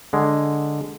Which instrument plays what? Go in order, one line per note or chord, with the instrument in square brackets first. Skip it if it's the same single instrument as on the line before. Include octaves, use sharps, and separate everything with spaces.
[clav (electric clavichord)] D3 G#3